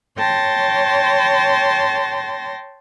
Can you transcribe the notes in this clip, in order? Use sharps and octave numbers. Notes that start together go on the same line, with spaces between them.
C#5 G5 A5 C6 A#6